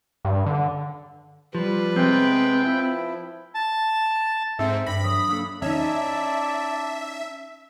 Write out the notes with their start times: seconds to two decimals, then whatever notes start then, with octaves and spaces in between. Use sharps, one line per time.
0.25 G2
0.46 D3
1.55 F3 G3 B4
1.96 C3 G#3 B3 C4 G5
2.64 F3 E4
3.54 A5
4.59 G#2 C4 A4 E5
4.87 G2 B5 A#6
5.04 F#3 D#6
5.29 A#3 D4 A4
5.62 C#4 D#4 E4 D5 E5 A5